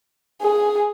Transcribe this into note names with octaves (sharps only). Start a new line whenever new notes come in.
G#4